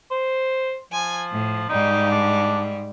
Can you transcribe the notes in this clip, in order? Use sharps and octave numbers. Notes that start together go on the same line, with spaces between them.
C5
F3 G#5
A2
G#2 G3 D#4
D4